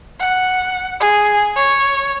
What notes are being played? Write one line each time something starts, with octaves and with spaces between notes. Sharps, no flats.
F#5
G#4
C#5